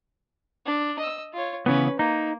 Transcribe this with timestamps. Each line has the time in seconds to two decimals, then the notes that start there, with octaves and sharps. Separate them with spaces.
0.66 D4
0.99 D#5 E6
1.33 F4 C#5
1.66 C#3 E3 B3 C#4 B4
1.99 A#3 D#4